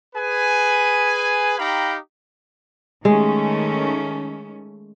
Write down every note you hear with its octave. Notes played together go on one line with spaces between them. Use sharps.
G#4 B4 G#5
D#4 G4 F5 G5 A#5 B5
D#3 G#3 A3 C#4